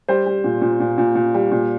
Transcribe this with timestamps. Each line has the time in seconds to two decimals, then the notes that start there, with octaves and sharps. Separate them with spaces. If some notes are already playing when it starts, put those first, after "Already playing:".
0.08 G3 C5
0.26 G3
0.44 A#2
0.62 A#2
0.80 A#2
0.98 A#2
1.15 A#2
1.34 G3
1.52 A#2